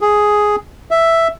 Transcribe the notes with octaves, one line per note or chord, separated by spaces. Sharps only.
G#4
E5